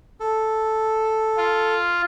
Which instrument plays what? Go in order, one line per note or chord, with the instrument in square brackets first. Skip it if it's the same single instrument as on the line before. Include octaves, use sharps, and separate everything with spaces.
[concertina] A4
[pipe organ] F4